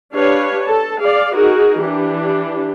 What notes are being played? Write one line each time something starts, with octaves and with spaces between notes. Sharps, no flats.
D4 G4 B4 C#5 F5
A4 A5
G#4 D5 F5
D#4 F#4 G#4 A#4
E3 D4 G4